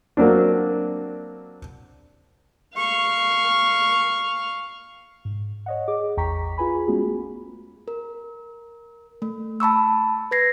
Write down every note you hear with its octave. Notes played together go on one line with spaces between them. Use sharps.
F#3 A#3 C4 D4
F5 C#6
G#2
C#5 D#5 F#5
G#4 D#5 D6
A1 E2 G5 A#5 C#6 B6
F4 G#4 B4 G#5 B5
G#3 A3 B3 C#4 F#4 G#4
A#4
A3
A5 B5 C#6 E6
B4 G#6 A#6 C7